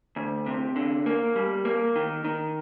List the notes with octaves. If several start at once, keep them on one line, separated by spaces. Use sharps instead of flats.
D2
C3
D3
A#3
G3
A#3
D#3
D#3